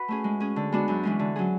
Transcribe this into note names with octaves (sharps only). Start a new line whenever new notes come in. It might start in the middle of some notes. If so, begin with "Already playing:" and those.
Already playing: F#4 B4
A3 C#4 G#4
G#3
C#4 G#4
D3
G#3 B3 D4 F#4
F#2
E3 G#3 C#4
D3
F#3 C#4 G#4